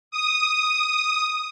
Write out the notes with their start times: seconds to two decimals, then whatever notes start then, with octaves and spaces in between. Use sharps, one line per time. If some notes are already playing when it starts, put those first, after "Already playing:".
0.11 D#6